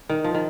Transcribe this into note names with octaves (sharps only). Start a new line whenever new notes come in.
D#3
F3
D#3